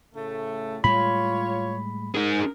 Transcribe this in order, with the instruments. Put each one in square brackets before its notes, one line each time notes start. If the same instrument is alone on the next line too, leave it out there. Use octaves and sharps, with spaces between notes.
[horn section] A2 C#3 A3
[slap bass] A2 G3 G#3 [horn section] F4 C#5 [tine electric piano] B5
[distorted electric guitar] D#4 G#4 [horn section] A#4